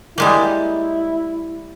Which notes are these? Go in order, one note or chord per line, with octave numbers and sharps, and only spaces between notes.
G3 G#3 A#3 E4